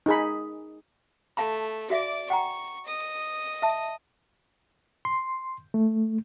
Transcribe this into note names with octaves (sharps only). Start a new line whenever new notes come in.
D#4 G#4 B5
A3 F5 A5 B5
F#4 D5 E5 F5 D6
F#5 G5 A#5 C#6
D#5 D#6
E5 A5
C6
A3